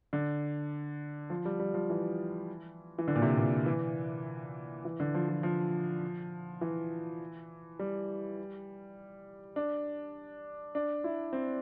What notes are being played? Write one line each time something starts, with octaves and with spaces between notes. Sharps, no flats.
D3
F3
G3
G3
F3
E3
E3
D3
A#2
C3
A#2
E3
E3
D3
F3
F3
F3
E3
G3
D4
D4
E4
C4